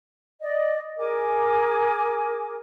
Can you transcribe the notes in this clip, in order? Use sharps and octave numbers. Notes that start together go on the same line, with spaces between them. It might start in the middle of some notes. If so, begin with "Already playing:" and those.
D5 D#5
G#4 A#4 G#5 D6